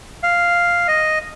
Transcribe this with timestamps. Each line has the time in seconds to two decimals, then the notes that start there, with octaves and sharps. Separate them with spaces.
0.23 F5
0.88 D#5